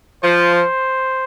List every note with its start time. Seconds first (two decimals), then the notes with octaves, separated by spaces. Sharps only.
0.23 F3 C5
0.55 C5